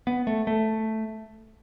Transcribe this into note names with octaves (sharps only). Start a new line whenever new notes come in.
B3
A3
A3